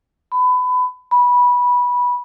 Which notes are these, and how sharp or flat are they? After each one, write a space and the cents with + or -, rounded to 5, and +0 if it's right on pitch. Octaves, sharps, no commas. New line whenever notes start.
B5 +25
B5 -15